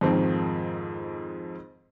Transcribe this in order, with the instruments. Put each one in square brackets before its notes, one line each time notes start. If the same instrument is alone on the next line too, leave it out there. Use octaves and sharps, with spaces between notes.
[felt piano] F2 G#2 D#3 F3 C4